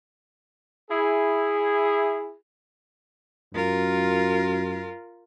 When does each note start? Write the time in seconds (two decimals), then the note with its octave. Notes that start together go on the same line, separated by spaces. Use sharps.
0.91 E4 G#4
3.55 F#2 F4 A#4